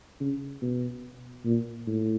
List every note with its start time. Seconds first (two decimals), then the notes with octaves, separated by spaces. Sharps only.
0.20 C#3
0.62 B2
1.45 A#2
1.87 A2